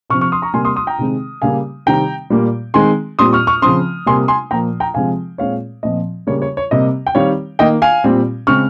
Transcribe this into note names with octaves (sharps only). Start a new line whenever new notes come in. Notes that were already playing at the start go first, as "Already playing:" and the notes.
C3 F3 C4 C#6 F6
C#6 F6
C6 D#6
A#5 C#6
C3 G3 A#3 G#5 C6
C6 D#6
C6 D#6
G5 A#5
C3 D#3 G#3 C4
C#3 G3 A#3 F5 G#5
C3 D#3 G3 C4 G5 A#5
A#2 G3 A#3
D#3 G#3 C4 G#5 C6
A#2 G3 C4 C6 D#6
C#6 F6
C#6 F6
C#3 F3 C4 C6 D#6
C3 G3 A#3 G#5 C6
G#5 C6
A#2 F3 A#3 G5 A#5
G5 A#5
C3 F3 G#3 C4 F5 G#5
A#2 G#3 C4 C#5 F5
A#2 F3 C4 D#5
C#3 G3 A#3 C#5
C#5
C#5
C3 G3 A#3 D#5
G5
D#3 G3 C4 C#5 F5
D#3 A#3 D#5 G5
F5 G#5
A#2 G3 C4
C#3 G#3 C4 C#6 F6